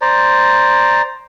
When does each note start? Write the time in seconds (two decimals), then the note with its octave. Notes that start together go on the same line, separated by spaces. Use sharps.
0.01 C5 D5 A#5